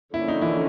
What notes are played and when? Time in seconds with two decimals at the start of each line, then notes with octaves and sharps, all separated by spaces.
0.14 D3 F3 A#3 C#4 E4
0.28 D#4
0.42 E3 E4